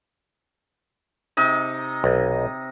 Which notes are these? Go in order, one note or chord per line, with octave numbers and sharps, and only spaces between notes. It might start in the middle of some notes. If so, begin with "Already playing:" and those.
C3 D#4 D#5
B1